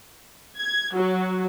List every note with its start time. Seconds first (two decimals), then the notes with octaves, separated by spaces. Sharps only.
0.59 G#6
0.95 F#3